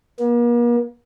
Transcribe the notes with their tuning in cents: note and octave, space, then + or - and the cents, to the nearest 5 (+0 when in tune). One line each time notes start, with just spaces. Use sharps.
A#3 +40